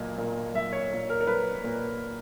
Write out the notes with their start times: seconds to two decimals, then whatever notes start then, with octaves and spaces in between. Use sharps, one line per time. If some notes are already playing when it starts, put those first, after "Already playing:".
Already playing: B1 A#2 A#3 D#5
0.18 A#2 A#3
0.54 B1 E5
0.73 C#5
0.92 A#2 A#3
1.10 A#4
1.21 A#4
1.27 B1 B4
1.64 A#2 A#3